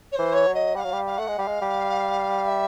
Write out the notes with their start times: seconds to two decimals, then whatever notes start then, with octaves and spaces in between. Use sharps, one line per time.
0.11 C#5
0.15 E3 C5
0.33 C#5
0.47 F#3
0.54 D#5
0.75 G3 F#5
0.79 F#3 F5
0.92 G3
1.07 F5
1.18 A3 F#5
1.28 G#3
1.38 G3 F5
1.47 G#3
1.61 G3
2.47 E5